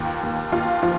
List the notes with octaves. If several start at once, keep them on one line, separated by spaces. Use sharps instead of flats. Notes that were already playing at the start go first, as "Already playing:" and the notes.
Already playing: D#2 F4
D#2
D#2 F4
F3 F4